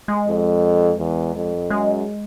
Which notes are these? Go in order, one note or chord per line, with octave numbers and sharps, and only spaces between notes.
G#3
F2
E2
F2
F#2 G#3